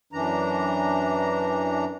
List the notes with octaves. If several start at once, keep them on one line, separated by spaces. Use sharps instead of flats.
F#2 E3 D4 A#5